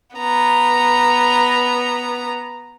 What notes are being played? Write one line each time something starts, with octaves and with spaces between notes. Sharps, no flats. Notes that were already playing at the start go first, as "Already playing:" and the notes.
B3 A#5